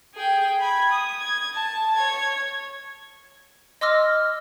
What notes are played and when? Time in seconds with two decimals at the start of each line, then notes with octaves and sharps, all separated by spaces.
0.15 G#4 G5
0.59 B5 G#6
0.91 D#6
1.20 G#6
1.54 A5
1.95 C#5 G#6
3.81 D#5 C6 D6 E6 F6 A#6